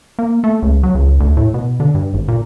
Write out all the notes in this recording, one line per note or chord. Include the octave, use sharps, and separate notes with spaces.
A#3
A3
C#2
F#3
C#2
D2
A2
B2
D3
G2
G#1
A#2